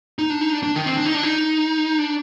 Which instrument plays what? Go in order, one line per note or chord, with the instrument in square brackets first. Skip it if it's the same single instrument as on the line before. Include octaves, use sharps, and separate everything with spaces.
[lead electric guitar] D#4
D4
D#4
D4
D4
D#3
C4
D4
D#4
D4
D#4
D4